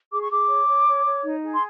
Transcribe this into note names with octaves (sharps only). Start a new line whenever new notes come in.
G#4 D6
C#6
G#4 D6
C#5
C#5
C#5
C#5
D#4
G#4
C6